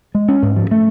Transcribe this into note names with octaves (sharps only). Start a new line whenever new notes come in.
G#3
C#4
G#2
F3
A3